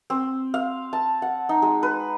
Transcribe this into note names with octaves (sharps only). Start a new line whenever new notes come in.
C4
F5
A5
F#5
D#4
G#3
B4